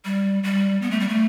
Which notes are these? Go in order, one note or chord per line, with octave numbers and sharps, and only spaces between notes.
G3
G3
B3
A3
G3
A3